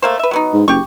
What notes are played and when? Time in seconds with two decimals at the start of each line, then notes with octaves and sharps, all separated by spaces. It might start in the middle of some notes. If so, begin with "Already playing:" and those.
0.02 A3 A#3 C5
0.19 B4 E5
0.31 F#3 B3 D#4
0.53 G#2
0.68 F#1 G4 C#6